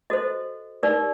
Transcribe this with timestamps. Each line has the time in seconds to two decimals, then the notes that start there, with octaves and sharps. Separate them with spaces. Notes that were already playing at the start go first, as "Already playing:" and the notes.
0.10 F#4 A4 C5 D#5
0.83 D#4 G4 A#4 D5